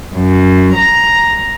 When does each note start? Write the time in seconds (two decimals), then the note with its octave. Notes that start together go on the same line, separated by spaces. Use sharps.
0.12 F#2
0.76 A#5